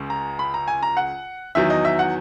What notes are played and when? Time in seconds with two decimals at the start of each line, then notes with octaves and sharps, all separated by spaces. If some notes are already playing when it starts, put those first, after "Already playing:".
Already playing: C#2 C#3
0.10 A#5
0.39 B5
0.54 A#5
0.68 G#5
0.83 A#5
0.97 F#5
1.55 E2 D#3 F#3 E5
1.70 D#5
1.85 E5
1.99 F#5